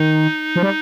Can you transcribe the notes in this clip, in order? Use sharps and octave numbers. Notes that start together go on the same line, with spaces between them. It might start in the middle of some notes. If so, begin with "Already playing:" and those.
Already playing: D#3 D#4
F3
G3